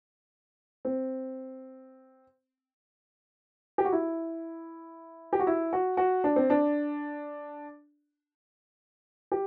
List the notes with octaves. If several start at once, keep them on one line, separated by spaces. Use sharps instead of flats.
C4
G4
F#4
E4
G4
F#4
E4
F#4
F#4
D4
C4
D4
G4